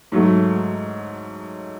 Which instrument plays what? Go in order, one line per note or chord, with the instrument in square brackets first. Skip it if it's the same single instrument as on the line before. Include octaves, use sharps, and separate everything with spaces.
[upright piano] G#2 F#3 A3